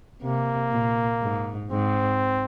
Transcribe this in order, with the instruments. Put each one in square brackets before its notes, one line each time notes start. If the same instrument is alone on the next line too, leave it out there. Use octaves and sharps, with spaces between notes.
[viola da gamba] C3 [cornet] A#3
[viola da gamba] A#2
G#2
[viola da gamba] G#2 [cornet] C4